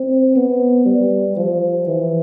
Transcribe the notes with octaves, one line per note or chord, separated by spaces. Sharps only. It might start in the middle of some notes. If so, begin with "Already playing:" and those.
Already playing: C4
B3
G3
F3
E3